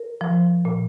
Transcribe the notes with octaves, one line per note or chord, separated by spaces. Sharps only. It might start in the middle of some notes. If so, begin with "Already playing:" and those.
Already playing: A#4
F3
A#2